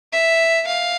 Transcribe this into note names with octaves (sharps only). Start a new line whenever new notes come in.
E5
F5